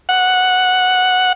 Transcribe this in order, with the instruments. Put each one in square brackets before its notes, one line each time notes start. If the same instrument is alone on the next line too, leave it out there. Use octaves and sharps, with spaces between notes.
[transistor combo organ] F#5